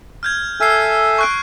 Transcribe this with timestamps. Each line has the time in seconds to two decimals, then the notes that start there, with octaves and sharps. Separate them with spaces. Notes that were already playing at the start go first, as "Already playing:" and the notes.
0.23 F6 G6 G#6
0.60 A4 E5 G#5 F6 C7
1.18 C#6 F#6 D7